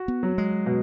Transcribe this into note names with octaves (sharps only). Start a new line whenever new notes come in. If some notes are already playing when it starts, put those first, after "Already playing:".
Already playing: F#4
B3
F#3
G#3
B2